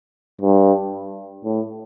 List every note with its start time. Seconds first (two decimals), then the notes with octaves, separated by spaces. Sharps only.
0.41 G2
1.45 A2